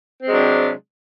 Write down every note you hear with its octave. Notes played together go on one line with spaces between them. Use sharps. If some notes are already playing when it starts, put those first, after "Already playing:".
C3 F#3 G#3 C4 D4